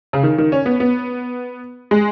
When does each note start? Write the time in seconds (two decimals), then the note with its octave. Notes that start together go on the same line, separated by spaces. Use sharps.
0.13 C#3
0.23 D#3
0.38 D#3
0.52 C#4
0.66 B3
0.80 B3
1.91 G#3